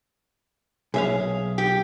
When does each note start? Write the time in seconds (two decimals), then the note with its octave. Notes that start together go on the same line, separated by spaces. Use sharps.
0.94 B1 G#4 E5 F5
1.58 G4